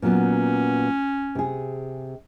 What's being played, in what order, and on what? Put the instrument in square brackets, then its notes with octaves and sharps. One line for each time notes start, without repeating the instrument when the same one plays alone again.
[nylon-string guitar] A#2 F#3 B3 [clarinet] C#4
[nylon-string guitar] C3 G#4